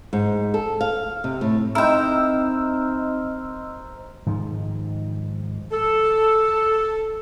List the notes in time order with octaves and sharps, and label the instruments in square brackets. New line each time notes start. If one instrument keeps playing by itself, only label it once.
[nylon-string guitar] G#2
A4
F5
C3
A2
[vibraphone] C4 D#4 [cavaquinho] E4 G5 [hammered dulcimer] A#4 C5 [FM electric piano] D#5 E6
[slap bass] G#2 D#3 F3
[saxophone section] A4